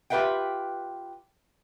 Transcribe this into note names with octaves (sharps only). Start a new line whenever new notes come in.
F4 G4 B4 E5 F#5 G5